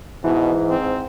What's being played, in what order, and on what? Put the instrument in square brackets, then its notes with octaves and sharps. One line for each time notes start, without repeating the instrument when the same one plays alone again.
[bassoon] G#2 [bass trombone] B2 [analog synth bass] E3
[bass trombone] C4